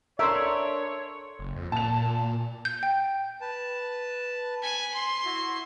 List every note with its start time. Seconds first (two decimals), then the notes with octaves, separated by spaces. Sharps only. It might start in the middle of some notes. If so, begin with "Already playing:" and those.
0.19 D4 A4 A#4 C#5 E5 C6
1.39 F#1
1.56 F2
1.72 A#2 A5 F7
2.65 G6
2.83 G5
3.41 B4 A5
4.63 G#5 B5
4.94 C6
5.25 E4 F#4